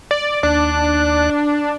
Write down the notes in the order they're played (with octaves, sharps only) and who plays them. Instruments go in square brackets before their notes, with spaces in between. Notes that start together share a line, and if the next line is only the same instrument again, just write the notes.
[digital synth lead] D5
[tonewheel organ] D#2 D5 F#6 [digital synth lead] D4